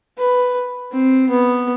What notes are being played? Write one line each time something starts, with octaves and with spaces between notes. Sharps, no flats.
B4
C4
B3